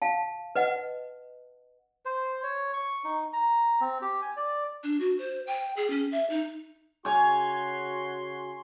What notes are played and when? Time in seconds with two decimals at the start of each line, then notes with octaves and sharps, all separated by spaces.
0.02 F5 A5
0.55 B4 D#5 F#5
2.05 C5
2.43 C#5
2.73 C#6
3.04 D#4
3.33 A#5
3.81 C4
4.02 G4
4.22 G#5
4.37 D5
4.83 D4
5.00 F#4
5.19 C5
5.47 G5
5.77 G#4
5.90 C#4
6.12 E5
6.30 D#4
7.05 C#3 F#4 C#5 G#5 C6